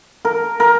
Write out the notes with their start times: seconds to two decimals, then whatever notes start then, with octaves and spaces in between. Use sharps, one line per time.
0.25 A#4
0.60 A#4